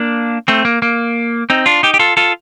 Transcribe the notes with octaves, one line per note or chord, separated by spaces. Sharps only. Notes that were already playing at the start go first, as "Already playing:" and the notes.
Already playing: A#3 D4
A3 C4
A#3
A#3
C4 D#4
D4 F4
D#4 G4
G4
F4 A4
F4 A4